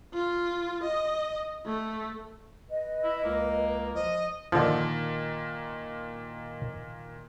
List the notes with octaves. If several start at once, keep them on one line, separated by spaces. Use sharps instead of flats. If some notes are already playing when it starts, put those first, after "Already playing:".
F4
D#5
A3
B4 D#5
E4
C#2 A#3
F3 D#5
A#2 D3 D#3 F3